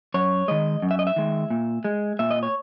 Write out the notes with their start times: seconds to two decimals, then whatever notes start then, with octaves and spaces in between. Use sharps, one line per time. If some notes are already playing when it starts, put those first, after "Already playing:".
0.14 F#2 C#5
0.48 D#3 G#3 D#5
0.82 F#2
0.91 E5
0.99 D#5
1.07 E5
1.16 D#3 G#3
1.50 A#2
1.85 G#3
2.19 A#2 E5
2.31 D#5
2.43 C#5